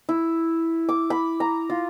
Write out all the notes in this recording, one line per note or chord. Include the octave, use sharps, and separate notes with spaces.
E4
D6
B5
A#5
F4